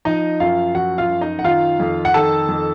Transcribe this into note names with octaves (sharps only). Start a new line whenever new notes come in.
F3 D#4 D#5
F#2 F4 F5
F3 F#4 F#5
F4 F5
F#2
D#4 D#5
F#5
D#3 F4 F5
F2
F#5
D#3 A4 A5
F2